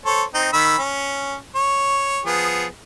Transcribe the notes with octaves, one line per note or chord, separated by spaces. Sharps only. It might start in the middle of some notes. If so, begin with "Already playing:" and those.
A4 C5 C#5
C4 D#4
D#3 B5 E6
C#4
C#5
F3 B3 G#4